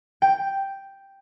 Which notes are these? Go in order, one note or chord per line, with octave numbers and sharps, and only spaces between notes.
G5